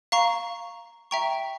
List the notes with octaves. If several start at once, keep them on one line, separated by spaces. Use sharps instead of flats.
F5 A#5 C#6
E5 G5 A#5 C#6